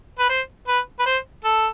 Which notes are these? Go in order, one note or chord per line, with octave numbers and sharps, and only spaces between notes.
B4
C5
B4
B4
C5
A4